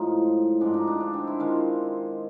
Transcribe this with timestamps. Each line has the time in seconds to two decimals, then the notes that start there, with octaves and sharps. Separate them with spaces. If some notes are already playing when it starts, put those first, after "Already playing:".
Already playing: A2 F3 G#3 D#4
0.60 G#2 F3 G#3 D4
0.74 D#4
0.87 D4
1.00 D4
1.14 C4
1.27 E4
1.40 D#3 G#3 F4